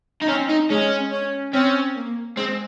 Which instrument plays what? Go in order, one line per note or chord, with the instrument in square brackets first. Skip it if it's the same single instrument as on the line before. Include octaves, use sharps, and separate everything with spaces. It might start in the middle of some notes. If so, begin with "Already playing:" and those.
[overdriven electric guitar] D#4
[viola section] C4 [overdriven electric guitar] C#4
[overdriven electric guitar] D#4
[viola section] G#3 [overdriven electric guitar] C#4
[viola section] C#4
[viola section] C4 [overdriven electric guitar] C#4
[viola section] A#3
[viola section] G#3 [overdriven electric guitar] C4